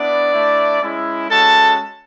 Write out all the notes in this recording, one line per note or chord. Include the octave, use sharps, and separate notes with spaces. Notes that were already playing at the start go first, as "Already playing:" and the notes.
Already playing: B3 D4 E4 D5
A3 E4
G#3 C#4 E4
G#3 C#4 F#4 A4 A5